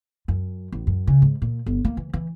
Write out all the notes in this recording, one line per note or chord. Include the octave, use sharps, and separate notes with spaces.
F#2
A1
F#2
C#3
G#2
A#2
G1
A#3
E3
E3